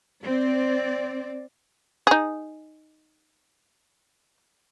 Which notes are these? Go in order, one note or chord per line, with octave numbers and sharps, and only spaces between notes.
C4 D5
D#4 G#4